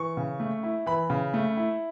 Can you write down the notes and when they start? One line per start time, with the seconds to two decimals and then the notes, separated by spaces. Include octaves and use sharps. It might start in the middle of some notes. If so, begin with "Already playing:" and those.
Already playing: E3 C#6
0.17 C#3
0.40 A3
0.63 E4
0.86 E3 B5
1.10 C#3
1.34 A3
1.57 E4